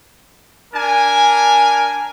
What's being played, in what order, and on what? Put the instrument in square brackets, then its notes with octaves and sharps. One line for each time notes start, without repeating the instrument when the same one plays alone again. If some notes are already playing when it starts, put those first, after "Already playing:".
[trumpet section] D4 A#4 G#5